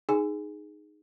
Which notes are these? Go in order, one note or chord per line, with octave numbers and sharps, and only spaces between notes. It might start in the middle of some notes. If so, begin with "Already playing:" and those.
D#4 G#4 G#5